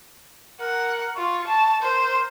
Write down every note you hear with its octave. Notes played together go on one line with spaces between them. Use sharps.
A#4 F#5
F4 C#6
A5
A#4 C5